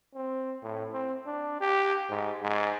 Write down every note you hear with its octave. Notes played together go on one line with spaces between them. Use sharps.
C4
A2
C4
D4
G4
G#2
G#2